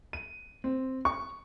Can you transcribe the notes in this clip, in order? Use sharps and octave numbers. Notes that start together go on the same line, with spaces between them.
D#7
C4
C#6